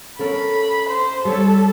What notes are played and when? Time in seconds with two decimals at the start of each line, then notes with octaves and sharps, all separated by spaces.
0.19 C#4 A4 A#4 B5
0.90 C5
1.25 G3 A4 C#5